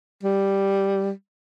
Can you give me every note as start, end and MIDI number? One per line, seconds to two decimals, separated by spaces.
0.23 1.11 55